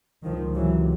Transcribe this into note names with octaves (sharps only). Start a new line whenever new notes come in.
C#2 C3 D#3 F3
E3 F#3